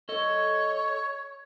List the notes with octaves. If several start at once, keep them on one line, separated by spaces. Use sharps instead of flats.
A4 C#5 D#5